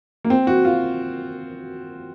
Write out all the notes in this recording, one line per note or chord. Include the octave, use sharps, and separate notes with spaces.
A#3
C4
F#4
F4